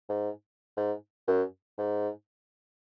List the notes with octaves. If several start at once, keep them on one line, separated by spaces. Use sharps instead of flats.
G#2
G#2
F#2
G#2